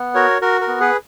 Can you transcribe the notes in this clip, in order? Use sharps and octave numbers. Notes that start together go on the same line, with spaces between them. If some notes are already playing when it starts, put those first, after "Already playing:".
Already playing: B3
F#4 A#4 C#5
F#4 A#4
A#4
B3
G#4 B4